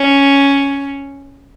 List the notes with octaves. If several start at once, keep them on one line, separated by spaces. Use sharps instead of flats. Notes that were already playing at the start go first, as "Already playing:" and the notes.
Already playing: C#4